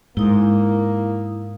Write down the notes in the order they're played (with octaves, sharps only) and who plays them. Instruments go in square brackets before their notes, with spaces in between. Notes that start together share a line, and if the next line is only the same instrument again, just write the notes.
[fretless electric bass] G#2 [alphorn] A#3 [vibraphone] E4 D#6